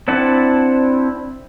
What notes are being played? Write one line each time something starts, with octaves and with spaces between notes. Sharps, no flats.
C4 D4 E4 F#5 A5